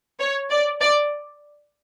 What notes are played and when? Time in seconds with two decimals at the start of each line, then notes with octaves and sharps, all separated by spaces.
0.19 C#5
0.50 D5
0.81 D5